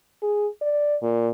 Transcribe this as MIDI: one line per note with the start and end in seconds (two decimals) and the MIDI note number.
0.22 0.47 68
0.62 0.96 74
1.02 1.29 46